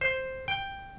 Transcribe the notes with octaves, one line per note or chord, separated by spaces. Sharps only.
C5
G5